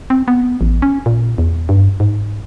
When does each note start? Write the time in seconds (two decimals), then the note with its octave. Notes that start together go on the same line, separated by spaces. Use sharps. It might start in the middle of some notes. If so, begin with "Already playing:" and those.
0.10 C4
0.28 B3
0.61 A1
0.82 C#4
1.06 A#2
1.38 E2
1.69 G2
2.00 G#2